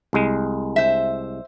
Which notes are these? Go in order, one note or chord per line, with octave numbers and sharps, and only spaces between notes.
C2 G#3
C5 E5